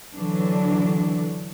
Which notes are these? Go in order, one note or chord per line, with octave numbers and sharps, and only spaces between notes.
D3 E3 F#3 D4